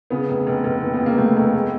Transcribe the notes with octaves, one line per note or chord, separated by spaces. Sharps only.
C#3 B3
F1
F1
F1
D#2
B3
C#3
A#3
F1 A3
F1
G#3